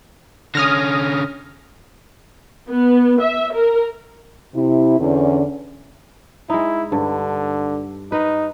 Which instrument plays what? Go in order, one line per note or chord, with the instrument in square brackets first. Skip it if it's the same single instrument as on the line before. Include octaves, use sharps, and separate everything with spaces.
[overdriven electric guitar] D3 C#4 [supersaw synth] D#6 F6 A#6
[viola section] B3
E5
A#4
[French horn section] C3 E4
E2 D3 C#4
[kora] G#3 D#4 [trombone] E4
[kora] G2 [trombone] D3
[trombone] D#4 [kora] B4